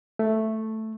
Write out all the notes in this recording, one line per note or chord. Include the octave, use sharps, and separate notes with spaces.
A3